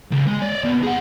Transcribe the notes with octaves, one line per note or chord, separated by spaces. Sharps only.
C#2
G#3
C#5 D5
C3 B3
G#4 F#5